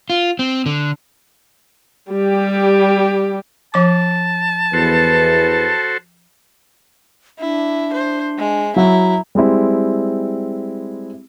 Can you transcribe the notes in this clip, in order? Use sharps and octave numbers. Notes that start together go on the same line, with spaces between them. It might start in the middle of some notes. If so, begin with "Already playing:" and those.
F4
C4
D3
G3 G4
F3 A5 D6
E2 F#4 A4 B4 C5
D4 E4
C5
G#3
F#3 E4 A#5
G3 G#3 C4 E4